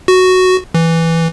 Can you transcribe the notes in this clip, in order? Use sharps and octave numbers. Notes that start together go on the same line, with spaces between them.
F#4
E3